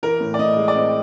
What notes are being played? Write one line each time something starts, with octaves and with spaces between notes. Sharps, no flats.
E3 A#4
A2
D5
A2 D#5
G#3
D5
C4 D#5